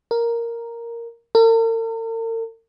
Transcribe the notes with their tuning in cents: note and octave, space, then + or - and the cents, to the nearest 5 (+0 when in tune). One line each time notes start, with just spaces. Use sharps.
A#4 +0
A#4 -45